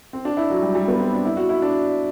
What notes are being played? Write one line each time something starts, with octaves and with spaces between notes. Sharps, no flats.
C4
D4
E4
F#3
G3
G3
B3
C4
D4
E4
F#4
E4
D4